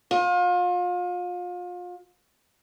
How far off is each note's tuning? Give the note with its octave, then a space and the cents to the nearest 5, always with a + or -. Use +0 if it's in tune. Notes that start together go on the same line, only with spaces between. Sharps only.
F4 +35